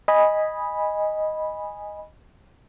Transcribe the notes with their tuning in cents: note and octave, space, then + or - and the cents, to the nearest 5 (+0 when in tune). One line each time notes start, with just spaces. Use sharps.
D#5 +0 G#5 -10 B5 -10